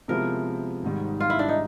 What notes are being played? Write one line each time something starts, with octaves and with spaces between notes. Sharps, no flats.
C3 F3 G#3 B3 E4 A#4
G#1 G#2 D#3 G3
F4
E4
D4
D#4